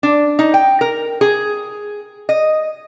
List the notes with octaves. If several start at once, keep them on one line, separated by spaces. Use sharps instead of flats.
D4
D#4
G5
A#4
G#4
D#5